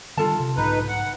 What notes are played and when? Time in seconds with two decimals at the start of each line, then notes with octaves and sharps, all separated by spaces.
0.17 D3 D#3 G3 F4 A4 A5
0.40 C3
0.57 B1 G#2 C#3 D#4 B4
0.88 F#5